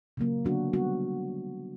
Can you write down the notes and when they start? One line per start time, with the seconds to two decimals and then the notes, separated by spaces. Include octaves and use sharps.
0.17 C#3 F#3 A#3
0.45 D3 F#3 B3 D4 F#4
0.73 G3 B3 F#4